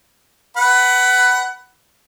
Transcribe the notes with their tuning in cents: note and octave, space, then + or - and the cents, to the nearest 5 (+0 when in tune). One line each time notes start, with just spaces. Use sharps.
B4 +0 F#5 +20 B5 +0